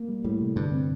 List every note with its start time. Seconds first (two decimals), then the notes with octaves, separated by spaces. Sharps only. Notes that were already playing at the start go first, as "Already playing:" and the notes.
Already playing: A#3
0.09 G3
0.24 A2 G3
0.40 C3
0.56 G2 D3
0.72 C4